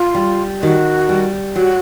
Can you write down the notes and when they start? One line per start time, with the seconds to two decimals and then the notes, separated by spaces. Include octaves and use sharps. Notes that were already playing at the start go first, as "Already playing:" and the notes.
Already playing: F4
0.15 G3
0.62 D#3 F#4
1.09 G3
1.56 F#3 F#4